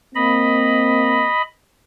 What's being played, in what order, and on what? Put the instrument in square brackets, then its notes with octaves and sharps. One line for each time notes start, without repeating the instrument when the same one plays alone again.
[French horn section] A#3 C4 [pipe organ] D#5 B5